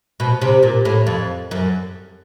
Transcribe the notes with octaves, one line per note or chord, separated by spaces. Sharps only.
B2
C3
A#2
A2
F2
F#2